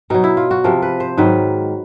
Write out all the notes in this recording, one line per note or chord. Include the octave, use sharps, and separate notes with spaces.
B2 F#3 D#4
E4
F4
F#4
C3 F3 A#4
B4
C5
G#2 D#3 F#3 B4